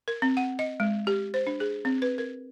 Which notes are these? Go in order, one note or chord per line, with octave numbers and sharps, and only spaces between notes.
A#4
C4
F#5
D#5
G#3
G4
C5
D4
G#4
C4
B4
A#4